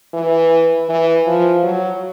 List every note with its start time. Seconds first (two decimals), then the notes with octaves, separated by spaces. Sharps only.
0.14 E3
0.89 E3
1.27 F3
1.63 F#3